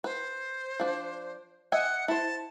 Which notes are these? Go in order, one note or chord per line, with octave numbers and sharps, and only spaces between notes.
B4 C5
F3 D4
D#5 E5 F#5 G#5
E4 C5 A5